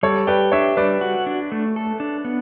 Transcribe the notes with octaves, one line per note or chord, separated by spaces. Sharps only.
G3 A4 C#5
G4 B4 D5
D4 C#5 E5
G3 B4 D5
F#4
D4
A3
A4
D4
B3